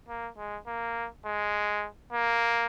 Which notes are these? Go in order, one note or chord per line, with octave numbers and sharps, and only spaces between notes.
A#3
G#3
A#3
G#3
A#3